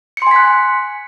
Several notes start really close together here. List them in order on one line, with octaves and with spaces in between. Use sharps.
C#7 C6 G#5 B6 F#6